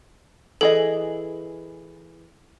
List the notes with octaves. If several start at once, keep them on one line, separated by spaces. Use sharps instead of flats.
E3 G#4 A4 D#5